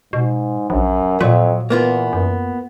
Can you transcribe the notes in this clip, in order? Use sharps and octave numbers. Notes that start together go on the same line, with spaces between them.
G#2 B2
A#1 F#2
F2 A#2 F#3
E2 A#3 B3 F4
F#2